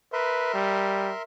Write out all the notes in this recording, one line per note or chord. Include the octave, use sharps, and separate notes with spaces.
A#4 B4 E5 C6
G3